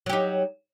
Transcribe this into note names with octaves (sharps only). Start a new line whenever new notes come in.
F#3 D#4 G4